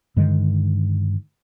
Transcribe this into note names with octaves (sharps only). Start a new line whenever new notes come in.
G2 D3 D#3 G#3